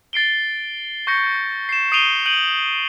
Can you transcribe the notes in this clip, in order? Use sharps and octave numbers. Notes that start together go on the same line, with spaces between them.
A6 C7 D7 G7
C#6 G6 A#6 C#7
C7 E7
D#6 C7 D7 D#7 F7 G7
G6 D7 D#7 F#7